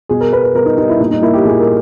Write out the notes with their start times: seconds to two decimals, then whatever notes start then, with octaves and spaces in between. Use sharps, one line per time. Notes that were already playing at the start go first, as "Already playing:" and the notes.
0.09 B2 G#4
0.21 A#4
0.33 B3 B4
0.43 B4
0.55 B2 A#4
0.66 D#4
0.77 G3 D#4
0.89 E4
1.00 A#2 D#4
1.11 D#4
1.22 A#3 E4
1.34 G4
1.45 A#2 G#4
1.60 A#4